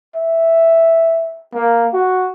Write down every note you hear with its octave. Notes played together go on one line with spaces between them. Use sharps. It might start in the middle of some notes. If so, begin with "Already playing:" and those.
E5
A#3
F#4